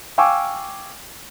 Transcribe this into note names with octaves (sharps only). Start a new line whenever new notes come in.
F5 G5 G#5 C#6 D6 E6